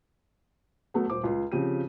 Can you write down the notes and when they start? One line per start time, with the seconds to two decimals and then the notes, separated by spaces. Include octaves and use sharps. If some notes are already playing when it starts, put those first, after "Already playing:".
0.94 F#3 A3 B3
1.10 D#1 C5 D6
1.24 C#2 F4
1.52 C#3 F3 C4 G4 D#7